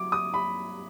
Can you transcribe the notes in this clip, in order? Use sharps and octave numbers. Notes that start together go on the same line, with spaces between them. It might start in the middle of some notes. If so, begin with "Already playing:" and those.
Already playing: F#3 D6
D#6
B5